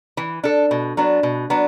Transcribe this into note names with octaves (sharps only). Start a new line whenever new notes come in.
E3
D4 A4
B2
F#3 B3 D4
B2
F#3 B3 D4